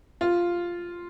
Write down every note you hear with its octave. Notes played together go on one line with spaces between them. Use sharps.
F4